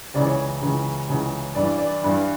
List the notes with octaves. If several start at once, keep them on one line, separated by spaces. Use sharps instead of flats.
C#2 C#3 E3 D5
C#5
C#2 C#3 E3
C#2 C#3 E3
G2 E3 D5
D5
G2 E3